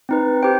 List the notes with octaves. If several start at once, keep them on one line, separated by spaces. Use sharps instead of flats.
C4 D#4 B4
G4 C5 G5